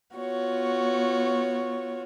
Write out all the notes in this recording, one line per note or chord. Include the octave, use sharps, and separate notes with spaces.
B3 F4 F#4 C#5